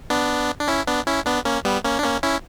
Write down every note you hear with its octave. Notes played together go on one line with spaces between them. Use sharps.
B3 D4
D4
C#4 E4
B3 D4
C#4 E4
B3 D4
A#3 C#4
G3 B3
A#3 C#4
D4
A#3 C#4
C#4 E4